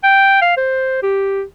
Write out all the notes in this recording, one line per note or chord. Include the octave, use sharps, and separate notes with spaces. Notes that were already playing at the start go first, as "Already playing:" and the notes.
G5
F5
C5
G4